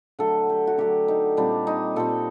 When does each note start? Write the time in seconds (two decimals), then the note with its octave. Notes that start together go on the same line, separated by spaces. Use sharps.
0.19 D3 F#3 A3 A4
0.49 G4
0.67 F#4
0.78 D3 F#3 A3 G4
1.08 D#4
1.37 A#2 G3 C4 D4
1.67 D#4
1.96 A#2 G3 C4 A4